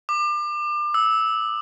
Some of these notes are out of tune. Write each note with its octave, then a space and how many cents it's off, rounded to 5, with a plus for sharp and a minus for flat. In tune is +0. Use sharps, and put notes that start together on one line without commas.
D6 +30
E6 -15